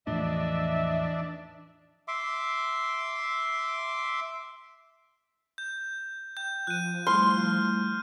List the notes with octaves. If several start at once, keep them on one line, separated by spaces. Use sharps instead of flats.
E2 A2 E3 F3 D4 D#5 E5
E5 C6 D6
G6
G5 G6
F3 F#6 D#7
G3 A3 E4 C6 F6